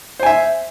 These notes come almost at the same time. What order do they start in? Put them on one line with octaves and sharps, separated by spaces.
C5 G#5 E5